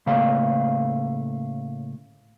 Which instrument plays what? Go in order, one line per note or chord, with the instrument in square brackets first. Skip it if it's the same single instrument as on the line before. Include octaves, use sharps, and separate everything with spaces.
[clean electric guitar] A2 C#3 A3 A#3 F5